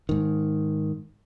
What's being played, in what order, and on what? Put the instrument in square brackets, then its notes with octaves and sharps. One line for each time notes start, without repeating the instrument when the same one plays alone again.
[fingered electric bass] G#2 D#3